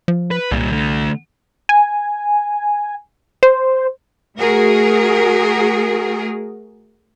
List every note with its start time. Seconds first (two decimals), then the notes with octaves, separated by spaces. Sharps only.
0.08 F3
0.31 B4
0.52 C2 A#2 G3
0.71 D3 A3
1.69 G#5
3.43 C5
4.39 A3 F#4 G#4 A#4